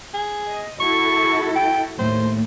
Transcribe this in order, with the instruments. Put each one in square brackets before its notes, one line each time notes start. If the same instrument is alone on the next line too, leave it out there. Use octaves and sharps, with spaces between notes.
[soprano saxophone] G#4
[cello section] D#5
[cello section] E4 F#4 A4 [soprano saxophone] C#6
[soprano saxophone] G5
[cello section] D#2 A2 [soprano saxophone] C5